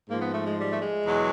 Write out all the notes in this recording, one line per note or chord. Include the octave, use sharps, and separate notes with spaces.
G#2 F3 A#3
B3
A3
G#3
G3
A3
G#3
E2 B2 F#3